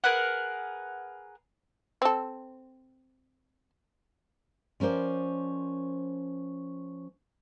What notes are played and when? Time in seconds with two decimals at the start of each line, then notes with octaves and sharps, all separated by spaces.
0.04 G#4 A#4 B4 F#5
2.02 C4 A4
4.80 F3 C#4 A#4 C5 D5